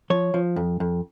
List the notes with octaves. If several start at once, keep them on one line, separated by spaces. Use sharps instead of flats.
F3 C#5
F3
F2
F2